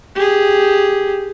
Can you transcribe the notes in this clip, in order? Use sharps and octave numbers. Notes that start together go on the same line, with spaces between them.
G4 G#4